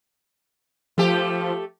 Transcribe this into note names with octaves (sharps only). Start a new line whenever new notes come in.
F3 A3 G4